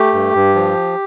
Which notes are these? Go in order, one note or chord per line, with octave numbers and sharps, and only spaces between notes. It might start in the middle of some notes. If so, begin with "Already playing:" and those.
Already playing: A3 G4
G2
G2
F3